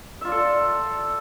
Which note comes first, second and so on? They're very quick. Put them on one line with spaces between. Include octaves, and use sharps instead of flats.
E5 F4 D5 A4